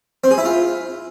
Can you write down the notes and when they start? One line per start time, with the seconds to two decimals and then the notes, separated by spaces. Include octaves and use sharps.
0.24 C4
0.31 G#4
0.38 E4
0.45 F4